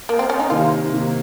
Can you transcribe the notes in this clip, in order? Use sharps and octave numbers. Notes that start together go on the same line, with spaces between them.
A#3
C4
C#4
D#4
C3 D#3 A#3 F4
C3 D#3 A#3